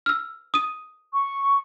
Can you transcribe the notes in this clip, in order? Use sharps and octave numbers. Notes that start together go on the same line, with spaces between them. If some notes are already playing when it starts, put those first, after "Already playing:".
E6 F6
D#6 D#7
C#6